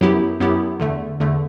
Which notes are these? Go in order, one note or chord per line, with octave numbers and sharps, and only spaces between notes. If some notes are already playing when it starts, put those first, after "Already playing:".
F#2 F#3 B3 E4 G4
F#2 F#3 B3 E4 G4
E2 D3 A3
E2 D3 A3